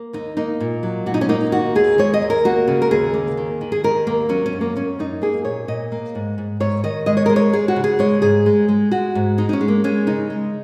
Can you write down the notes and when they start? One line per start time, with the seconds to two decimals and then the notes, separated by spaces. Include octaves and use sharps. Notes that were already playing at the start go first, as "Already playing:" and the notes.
Already playing: A#3
0.13 D#2 D#4
0.37 A#3 D#4
0.61 A#2
0.83 F#3
1.06 A#2 F#4
1.14 D#4
1.21 C#4
1.29 A#3 D#4
1.52 D#3 F#4
1.75 D#2 G#4
1.98 G#3 C#5
2.14 D#5
2.22 D#2
2.30 A#4
2.45 A#3 F#4
2.68 C#3
2.82 A#4
2.91 D#2 G#4
3.14 A#3
3.37 D#3
3.61 D#3
3.72 G#4
3.84 D#3 A#4
4.07 D#2 A#3
4.29 F#3 C#4
4.46 C#4
4.53 F#2
4.61 A#3
4.76 F#2 C#4
4.99 F#2 D#4
5.22 A#3 G#4
5.45 A#2 C#5
5.68 A#2 D#5
5.92 A#3
6.15 G#2
6.38 G#2
6.60 G#2 C#5
6.84 D#3 D#5
7.06 G#3 D#5
7.17 C#5
7.26 G#3 A#4
7.36 C#5
7.53 G#3 G#4
7.68 F#4
7.76 C#3
7.84 G#4
7.99 G#3 C#5
8.22 G#2 G#4
8.46 G#3
8.68 G#3
8.91 G#3 F#4
9.15 G#2
9.38 G#3 D#4
9.49 D#4
9.53 C#4
9.61 G#3
9.68 A#3
9.84 G#3 C#4
10.07 C#3 D#4
10.30 G#3